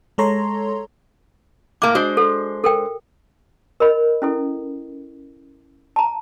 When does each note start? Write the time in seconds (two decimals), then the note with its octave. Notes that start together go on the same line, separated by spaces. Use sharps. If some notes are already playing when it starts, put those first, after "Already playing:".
0.18 G#3 A4 C#5 A#5 C6
1.82 A2 A#3 D6
1.95 G#3 D4 F#4 C5
2.17 A4
2.64 A4 A#4 G5
3.80 A#4 D#5 B5
4.22 C#4 E4 A4
5.96 A5 A#5